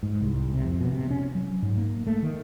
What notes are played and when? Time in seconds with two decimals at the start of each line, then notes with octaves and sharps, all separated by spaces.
0.03 G#2
0.21 C2
0.53 C3
0.65 F2
0.81 B2
0.92 C3
1.11 C#4
1.35 F#3
1.62 G#2
1.77 A#3
2.07 A3
2.23 D#3